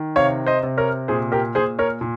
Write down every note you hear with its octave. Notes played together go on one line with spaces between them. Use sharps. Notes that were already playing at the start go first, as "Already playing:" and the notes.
Already playing: D#3
C3 C#5 F5
C5 D#5
C3
A#4 C#5
A#2 G#4 C5
G4 A#4
A#2 G#4 C5
A#4 C#5
A#2